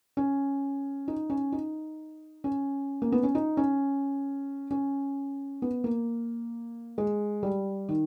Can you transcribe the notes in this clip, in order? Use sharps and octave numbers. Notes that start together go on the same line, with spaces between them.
C#4
D#4
C#4
D#4
C#4
A#3
B3
C#4
D#4
C#4
C#4
B3
A#3
G#3
G3
D#3